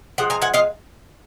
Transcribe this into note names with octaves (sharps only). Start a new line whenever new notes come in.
F3 G#3 F#5
G#5 A#5
F#5 G#5
D#5 F5